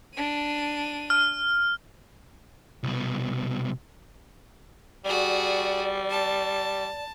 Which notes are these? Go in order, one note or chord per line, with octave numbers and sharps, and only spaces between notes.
D4 D#7
F6
C2 B2
G3 F#4 G#4 D5
A5